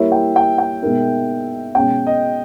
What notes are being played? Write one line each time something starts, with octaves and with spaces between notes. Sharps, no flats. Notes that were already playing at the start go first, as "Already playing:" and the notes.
Already playing: G3 A#3 E4 A#4 C#5 E5
G5
G5
G5
B2 G#3 D#4 A#4
B2 G#3 C#4 G5
D#5